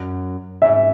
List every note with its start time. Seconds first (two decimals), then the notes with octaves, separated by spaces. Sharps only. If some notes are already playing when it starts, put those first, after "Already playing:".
Already playing: F#2
0.62 G#2 E5